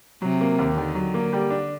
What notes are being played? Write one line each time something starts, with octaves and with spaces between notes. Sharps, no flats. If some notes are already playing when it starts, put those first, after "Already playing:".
C3 F#3
A#3
D#2
D3 D#3
F#3
A#3
G3
D4